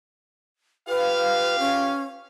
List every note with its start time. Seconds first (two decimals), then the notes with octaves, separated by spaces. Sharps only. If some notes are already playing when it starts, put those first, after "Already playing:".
0.88 F4 G4 B4 F5
1.59 C#4